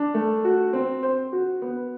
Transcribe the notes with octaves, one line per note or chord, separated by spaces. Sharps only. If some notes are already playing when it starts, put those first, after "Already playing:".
Already playing: D4
A3
F#4
C4
C5
F#4
B3